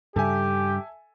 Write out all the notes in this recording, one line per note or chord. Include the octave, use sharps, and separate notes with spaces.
G2 C#3 G3 G4 A4 E5 G#5